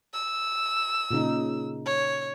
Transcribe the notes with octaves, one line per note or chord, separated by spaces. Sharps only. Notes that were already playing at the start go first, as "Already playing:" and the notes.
E6
A#2 C#3 D#4
C#5